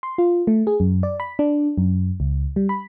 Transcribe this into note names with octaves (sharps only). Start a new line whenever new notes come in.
C6
F4
A3
G#4
F#2
D5
B5
D4
F#2
C#2
G3
B5